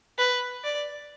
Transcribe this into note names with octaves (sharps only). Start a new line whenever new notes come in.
B4
D5